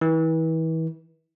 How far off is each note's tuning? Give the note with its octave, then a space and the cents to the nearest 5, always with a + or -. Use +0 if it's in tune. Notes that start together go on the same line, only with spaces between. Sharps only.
E3 -35